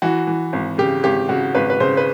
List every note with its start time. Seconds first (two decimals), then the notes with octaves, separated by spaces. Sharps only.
0.02 E3 F#4
0.27 E3
0.53 G#1
0.78 C#3 G4
1.04 G#1 G4
1.29 C#3 F#4
1.55 G#1 B4
1.70 B4
1.80 C#3 C5
1.97 B4